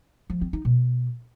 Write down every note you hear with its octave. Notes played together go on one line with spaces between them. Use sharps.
F3
C4
D#4
B2